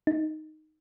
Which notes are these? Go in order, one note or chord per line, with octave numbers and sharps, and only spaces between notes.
D#4